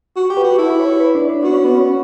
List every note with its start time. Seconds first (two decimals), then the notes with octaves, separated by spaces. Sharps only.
0.16 F#4
0.30 G4
0.37 B4
0.44 F#4
0.58 E4 A4
0.70 B4
0.80 C#5
0.90 C#5
1.00 B4
1.15 D4
1.29 D4
1.43 B3 F#4
1.53 C#4
1.64 B3
1.75 C#4